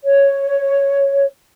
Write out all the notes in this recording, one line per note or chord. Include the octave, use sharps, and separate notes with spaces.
C#5